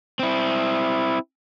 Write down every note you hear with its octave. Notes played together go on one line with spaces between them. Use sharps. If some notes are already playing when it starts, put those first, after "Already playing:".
C4 E4